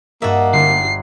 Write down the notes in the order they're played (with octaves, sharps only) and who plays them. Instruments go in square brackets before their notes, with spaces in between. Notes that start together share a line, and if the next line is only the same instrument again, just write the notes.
[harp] G2 A4 D#5 [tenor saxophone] A#3 [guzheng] F#4 E5
[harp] G1 [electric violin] C7